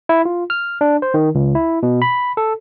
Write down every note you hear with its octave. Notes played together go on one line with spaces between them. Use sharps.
E4
F4
F6
D4
C5
D#3
C#2
E4
B2
B5
A4